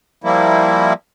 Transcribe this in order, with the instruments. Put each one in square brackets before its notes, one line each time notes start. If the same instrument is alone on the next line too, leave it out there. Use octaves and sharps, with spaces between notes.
[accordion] F3 G3 A#3 E4